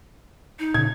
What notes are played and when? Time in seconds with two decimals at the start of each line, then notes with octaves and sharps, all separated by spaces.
0.59 D#4
0.74 A#2 C#3 G#6